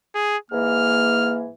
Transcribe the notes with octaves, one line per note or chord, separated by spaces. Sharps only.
G#4
G#2 E3 A#3 F6